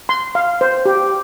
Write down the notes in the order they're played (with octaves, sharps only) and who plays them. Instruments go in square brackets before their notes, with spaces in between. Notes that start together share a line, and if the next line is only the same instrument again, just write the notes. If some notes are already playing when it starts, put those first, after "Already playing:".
[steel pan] C6
F5
C5
G4